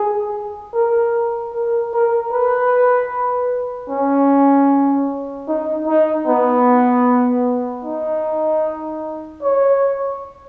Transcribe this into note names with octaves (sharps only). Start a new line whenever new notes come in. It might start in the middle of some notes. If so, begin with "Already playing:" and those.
Already playing: G#4
A#4
A#4
A#4
B4
C#4
D#4
D#4
B3
D#4
C#5